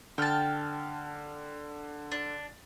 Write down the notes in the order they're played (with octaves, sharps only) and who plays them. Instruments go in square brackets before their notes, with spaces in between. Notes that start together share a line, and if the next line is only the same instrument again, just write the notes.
[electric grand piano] D3 F6 [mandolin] G5 A5
[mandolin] D4